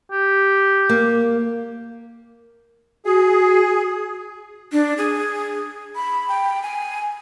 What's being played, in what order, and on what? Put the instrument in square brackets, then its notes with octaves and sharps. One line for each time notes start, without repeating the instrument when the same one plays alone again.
[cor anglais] G4
[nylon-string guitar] A#3
[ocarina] F#4 [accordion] G#4
[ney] D4
G#4
B5
G5
G#5